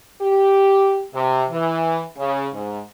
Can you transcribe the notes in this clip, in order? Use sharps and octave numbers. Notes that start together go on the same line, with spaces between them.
G4
C3
E3
C#3
G#2